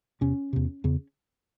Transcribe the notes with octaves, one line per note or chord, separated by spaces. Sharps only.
E2 C3 C#4
E2 C3
E2 C#3